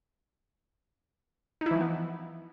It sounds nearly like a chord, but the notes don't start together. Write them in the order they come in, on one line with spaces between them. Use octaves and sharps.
D#4 E4 E3 F3 B3